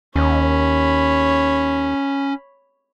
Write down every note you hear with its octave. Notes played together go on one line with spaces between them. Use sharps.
D#2 C#4 C#5 B5